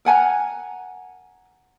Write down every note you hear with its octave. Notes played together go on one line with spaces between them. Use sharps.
A#4 F#5 G#5 A#5